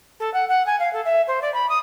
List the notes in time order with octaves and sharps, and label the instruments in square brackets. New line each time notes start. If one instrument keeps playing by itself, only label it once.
[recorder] A4
F#5
F#5
G#5
F5
A4
E5
C5
D5
B5
D#6